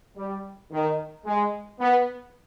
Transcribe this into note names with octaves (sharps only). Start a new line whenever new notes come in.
G3
D#3
G#3
B3